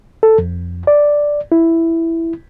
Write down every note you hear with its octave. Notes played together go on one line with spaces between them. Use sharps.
A4
F2
D5
E4